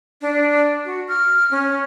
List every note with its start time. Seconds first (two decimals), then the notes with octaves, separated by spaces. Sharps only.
0.21 D4
0.85 F#4
1.08 F6
1.51 C#4